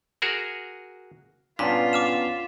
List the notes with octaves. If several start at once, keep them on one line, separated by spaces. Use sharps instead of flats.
F#4 G#4 A#4
G2 A#2 B3 C#4 D4 F4 B6
D6 F6 E7